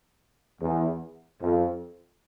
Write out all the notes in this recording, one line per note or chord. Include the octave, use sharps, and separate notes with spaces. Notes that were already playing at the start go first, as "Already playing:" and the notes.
E2
F2